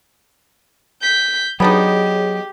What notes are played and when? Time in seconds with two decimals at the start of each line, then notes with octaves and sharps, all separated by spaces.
1.02 G6 B6
1.60 F#3 B3 D4 D#4 G4 G#4 C#5